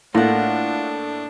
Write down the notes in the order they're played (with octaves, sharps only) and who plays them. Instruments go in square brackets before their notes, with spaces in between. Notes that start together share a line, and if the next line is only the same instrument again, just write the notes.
[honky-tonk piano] A2 [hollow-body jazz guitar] A3 A#3 [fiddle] D4 [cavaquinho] F4 F#5